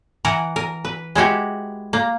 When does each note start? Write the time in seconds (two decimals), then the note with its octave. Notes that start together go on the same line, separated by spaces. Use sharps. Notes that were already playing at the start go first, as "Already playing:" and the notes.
0.25 E3 A#4 F#5
0.56 A#4
0.85 B4
1.15 G#3 E4 F#4 G4
1.93 A#3